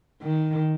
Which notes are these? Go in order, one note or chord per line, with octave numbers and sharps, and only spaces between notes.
D#3